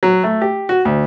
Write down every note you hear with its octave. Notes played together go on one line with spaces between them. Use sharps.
F#3
A3
G4
F#4
D2